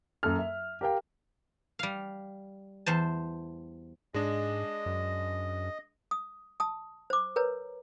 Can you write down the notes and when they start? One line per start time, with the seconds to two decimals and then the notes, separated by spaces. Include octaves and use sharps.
0.23 F#2 A#3 A4 F6
0.39 E5
0.81 G4 A#4 F5 G5
1.79 G3 F5
2.86 E2 C5 A5
4.14 G#2 G#3 D4 D#5
4.86 F#2
6.11 D#6
6.60 A5 D#6
7.10 C5 D6
7.36 A#4 B4 C#5 A#5